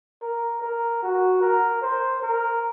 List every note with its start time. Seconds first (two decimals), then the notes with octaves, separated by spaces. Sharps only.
0.22 A#4
0.62 A#4
1.03 F#4
1.41 A#4
1.82 C5
2.22 A#4